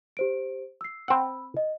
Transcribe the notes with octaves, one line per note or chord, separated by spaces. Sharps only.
G4 C5 D7
E6 C7
C4 F#5 B5 E6
D#5